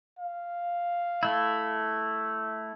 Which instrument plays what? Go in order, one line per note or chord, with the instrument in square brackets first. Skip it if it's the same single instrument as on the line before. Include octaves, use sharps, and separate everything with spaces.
[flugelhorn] F5
[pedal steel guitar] A3 E4